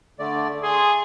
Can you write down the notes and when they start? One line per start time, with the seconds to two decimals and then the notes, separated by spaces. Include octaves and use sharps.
0.19 D3 A3 D5
0.63 G#4 C6